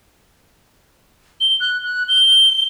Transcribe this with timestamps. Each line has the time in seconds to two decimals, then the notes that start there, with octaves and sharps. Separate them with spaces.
1.41 G7
1.61 F#6
1.84 F#6
2.08 G7